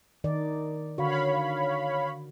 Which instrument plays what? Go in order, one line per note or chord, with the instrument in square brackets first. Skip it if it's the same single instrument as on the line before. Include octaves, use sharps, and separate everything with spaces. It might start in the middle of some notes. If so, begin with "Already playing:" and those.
[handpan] D#3 D#4 D5
[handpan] D3 F#4 [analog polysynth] C#5 F5 B5